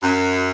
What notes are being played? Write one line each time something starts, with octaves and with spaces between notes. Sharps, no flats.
F#2